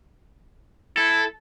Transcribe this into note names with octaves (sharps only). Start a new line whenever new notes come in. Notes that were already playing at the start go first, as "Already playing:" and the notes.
E4 A4